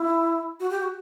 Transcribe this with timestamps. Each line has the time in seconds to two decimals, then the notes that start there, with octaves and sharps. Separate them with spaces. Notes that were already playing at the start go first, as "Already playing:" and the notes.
Already playing: E4
0.60 F#4
0.70 G4
0.80 F#4